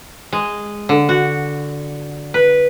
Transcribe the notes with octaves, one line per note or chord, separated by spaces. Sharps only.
G#3
D3
F#4
B4